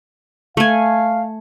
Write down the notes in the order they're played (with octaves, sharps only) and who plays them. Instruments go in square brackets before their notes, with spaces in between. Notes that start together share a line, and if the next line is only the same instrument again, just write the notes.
[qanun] A3 G#5 [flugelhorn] F5